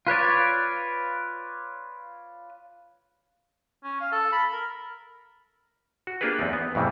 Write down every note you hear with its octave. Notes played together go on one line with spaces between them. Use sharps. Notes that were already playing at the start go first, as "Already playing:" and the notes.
F4 B4 C#5 D5
C#4
F5
A4
B5
A#4
F#4
A#3 D4 F4 G4 G#4 B4
E2 C4 D#4
B3
F2 A2 C#3 E3 G3